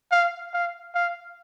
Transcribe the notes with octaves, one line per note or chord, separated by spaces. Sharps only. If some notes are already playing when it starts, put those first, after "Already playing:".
F5
F5
F5